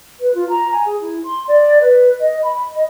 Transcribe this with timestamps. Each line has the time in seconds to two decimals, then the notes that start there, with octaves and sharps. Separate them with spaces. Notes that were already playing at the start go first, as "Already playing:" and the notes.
0.19 B4
0.34 F4
0.48 A#5
0.71 G#5
0.85 G#4
1.00 E4
1.23 C6
1.47 D5
1.81 B4
2.20 D#5
2.41 B5
2.72 D#5